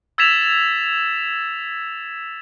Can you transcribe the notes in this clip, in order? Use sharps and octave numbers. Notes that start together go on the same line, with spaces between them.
E6 G#6 A6 B6 E7 F7